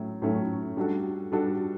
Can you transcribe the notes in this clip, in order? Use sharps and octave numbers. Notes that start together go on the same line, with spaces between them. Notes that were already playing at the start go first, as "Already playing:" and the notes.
Already playing: A2 F#3 A3 C#4
A2 F#3 A3 C#4
G3 D4 F#4 A4
G3 D4 F#4 A4